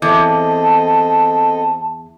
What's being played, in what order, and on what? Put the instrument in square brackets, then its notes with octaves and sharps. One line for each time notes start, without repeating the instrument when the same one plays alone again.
[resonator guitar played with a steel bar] E2 [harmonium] C4 A4 D#5 [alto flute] A5